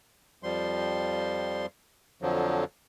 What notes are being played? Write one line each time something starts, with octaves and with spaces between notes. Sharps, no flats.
F2 F3 G3 C6
F2 D3 F3 F#3